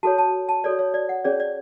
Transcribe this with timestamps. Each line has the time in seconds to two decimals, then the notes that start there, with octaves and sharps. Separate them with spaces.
0.03 F#4 A4 C#5 A5
0.18 A5
0.49 A5
0.64 F#4 A4 C#5 D5
0.79 C#5
0.94 D5
1.09 F#5
1.25 C#4 G#4 C#5 D5
1.40 D5